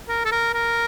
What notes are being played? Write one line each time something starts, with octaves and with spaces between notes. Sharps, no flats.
A#4
A4
A#4
A#4